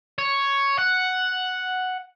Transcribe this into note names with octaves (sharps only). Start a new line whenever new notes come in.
C#5
F#5